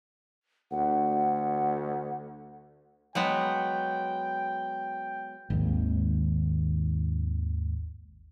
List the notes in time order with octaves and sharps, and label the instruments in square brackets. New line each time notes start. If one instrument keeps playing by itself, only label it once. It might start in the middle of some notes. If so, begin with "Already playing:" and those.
[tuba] D2 [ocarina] F#5
[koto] F#3 G#3 B3 [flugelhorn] G5
[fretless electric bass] G#1 D#2